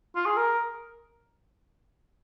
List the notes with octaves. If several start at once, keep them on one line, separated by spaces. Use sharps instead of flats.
F4
G#4
A#4